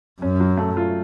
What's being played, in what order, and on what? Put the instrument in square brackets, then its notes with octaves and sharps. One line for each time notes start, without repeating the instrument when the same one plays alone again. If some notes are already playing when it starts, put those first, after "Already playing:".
[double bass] F#2 [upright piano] C#4
[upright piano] F#3
A3
F4